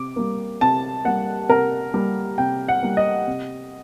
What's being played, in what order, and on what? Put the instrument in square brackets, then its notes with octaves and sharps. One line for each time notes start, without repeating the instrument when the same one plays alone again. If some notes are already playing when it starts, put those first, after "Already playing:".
Already playing: [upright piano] C3 D6
G3 A#3
C3 A5
G3 A#3 F#5
C3 A#4
G3 A#3
C3 G5
F#5
G3 A#3
D#5
C3